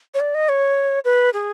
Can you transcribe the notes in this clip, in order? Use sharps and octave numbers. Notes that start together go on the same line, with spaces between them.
C#5
D5
D#5
C#5
B4
G#4